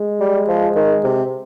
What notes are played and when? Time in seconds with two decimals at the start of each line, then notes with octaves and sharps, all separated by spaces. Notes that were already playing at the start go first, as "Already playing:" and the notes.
Already playing: G#3
0.20 G3
0.48 F3
0.76 D#3
1.04 C3